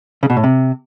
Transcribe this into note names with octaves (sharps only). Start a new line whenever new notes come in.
C#3
B2
A2
C3